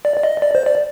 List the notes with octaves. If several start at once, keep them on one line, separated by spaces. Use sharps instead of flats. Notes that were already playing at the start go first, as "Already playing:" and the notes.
D5
D5
D#5
D5
C5
D5